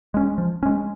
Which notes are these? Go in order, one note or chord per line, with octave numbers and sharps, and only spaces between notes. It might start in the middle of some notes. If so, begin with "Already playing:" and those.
G#3 C#4
F3
G#3 C#4